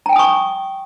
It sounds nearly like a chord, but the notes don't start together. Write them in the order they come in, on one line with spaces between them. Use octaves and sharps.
A#5 G5 G#5 D#6 C#6